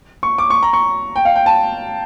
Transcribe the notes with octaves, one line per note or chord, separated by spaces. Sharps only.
C#6
D6
C#6
A#5
C#6
G5
F5
G5
A5